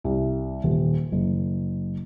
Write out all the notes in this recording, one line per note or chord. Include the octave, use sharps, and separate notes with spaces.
C2
D#1
F#1